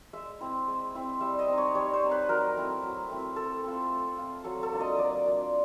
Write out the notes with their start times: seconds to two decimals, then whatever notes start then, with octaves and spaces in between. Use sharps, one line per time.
0.13 G#3 E5
0.40 C4 E4
0.68 G#3
0.95 C4 E4
1.21 G3 E5
1.39 D#5
1.48 C4 D#4
1.58 C#5
1.75 G3 C#5
1.93 C5
2.02 C4 D#4
2.11 B4
2.29 F#3 A#4
2.56 A3 C4 E4
2.82 F#3
3.09 A3 C4 E4
3.36 A3 A4
3.64 C4 F4
3.91 A3
4.18 C4 F4
4.44 F#3 A4
4.63 A4
4.72 A#3 D4 F4
4.81 D#5
4.98 F#3 D5
5.26 A#3 D4 F4